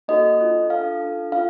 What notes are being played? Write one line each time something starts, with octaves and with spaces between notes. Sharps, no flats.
A#3 D#4 F#4 A4 D#5
D4 F4 A4
D4 F4 A4 F5
D4 F4 A4
D4 F4 A4 F5